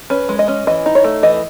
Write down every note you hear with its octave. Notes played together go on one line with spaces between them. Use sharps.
C#4 B4
G#3
D#5
C#4
E3 D#5
D#4
C#5
A3
E3 D#5